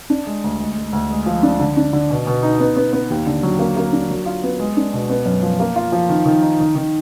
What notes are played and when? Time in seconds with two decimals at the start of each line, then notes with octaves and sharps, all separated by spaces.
0.10 D4
0.27 G#3
0.44 D2
0.60 G#3
0.77 G#3
0.93 D2
1.11 G#3
1.26 F3
1.43 D4
1.60 D3
1.77 D4
1.93 D3
2.10 B2
2.27 B2
2.43 D#4
2.60 B3
2.77 B3
2.93 B3
3.10 D#2
3.27 D3
3.43 F#3
3.59 A#3
3.77 A#3
3.93 D4
4.10 F#3
4.26 F4
4.43 B3
4.60 G#3
4.77 D4
4.93 B2
5.10 B3
5.26 F#2
5.42 F3
5.59 A#3
5.76 F4
5.92 F3
6.09 D#3
6.26 D#3
6.42 D#4
6.60 D#3
6.76 D#3